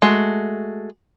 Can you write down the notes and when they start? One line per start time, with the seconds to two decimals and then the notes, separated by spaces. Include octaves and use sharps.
0.02 G#3 A3 F#4